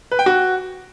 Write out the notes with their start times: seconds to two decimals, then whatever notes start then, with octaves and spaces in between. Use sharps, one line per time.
0.12 B4
0.19 G5
0.26 F#4